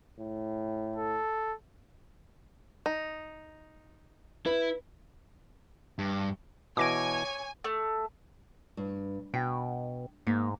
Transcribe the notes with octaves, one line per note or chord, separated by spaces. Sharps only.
A2
A4
D#4
E4 B4
G2
B2 E3 C#5 G#5 D6 A#6 D7
A3
G2
B2 G5
G#2 A#3